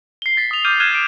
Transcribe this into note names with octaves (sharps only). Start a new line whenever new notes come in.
C7 G7
A6 B6
D#6 F7
D6 F6 G6 D#7 G7
F6 F#6 G#6 D#7 E7 G7
D7